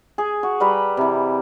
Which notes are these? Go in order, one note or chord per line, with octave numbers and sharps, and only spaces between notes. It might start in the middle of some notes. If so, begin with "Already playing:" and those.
G#4
F#4
G3 B4 A#5
C3 E3